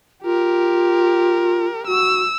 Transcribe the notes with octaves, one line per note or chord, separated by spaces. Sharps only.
F4 G4 A#4
F#4 E6